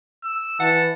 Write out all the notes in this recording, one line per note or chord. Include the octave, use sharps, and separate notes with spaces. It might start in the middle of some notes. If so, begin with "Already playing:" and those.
E6
E3 F#5 A5